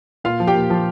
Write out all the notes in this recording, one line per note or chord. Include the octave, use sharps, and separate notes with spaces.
A#2 F4 F5
F3
G4 G5
A#2
F3